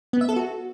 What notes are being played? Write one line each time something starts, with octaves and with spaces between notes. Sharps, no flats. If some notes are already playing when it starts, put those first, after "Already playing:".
B3
E5
A4
F#4